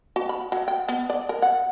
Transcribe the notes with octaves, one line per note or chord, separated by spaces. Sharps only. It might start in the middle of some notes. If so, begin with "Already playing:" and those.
F#4
B5
F#3
G5
B3
D5
A#4
F#5